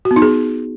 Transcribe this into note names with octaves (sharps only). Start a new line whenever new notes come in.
F#4
B3
D#4
G#4